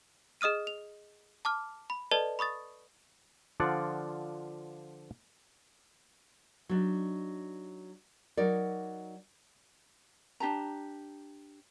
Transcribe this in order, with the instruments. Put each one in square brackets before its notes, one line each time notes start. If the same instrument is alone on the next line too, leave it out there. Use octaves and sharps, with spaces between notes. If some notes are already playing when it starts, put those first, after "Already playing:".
[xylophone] G#4 D#5 D#6 F6 D#7
F7
A5 D6 F6
B5
A4 B4 D5 D#5 A5
B5 C#6 D#6 A6
[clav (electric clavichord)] D3 F3 F4 D5 F#5
[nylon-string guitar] F#3 D4 D#4
F#3 D#4 A#4 D5
[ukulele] D4 G4 A5 A#5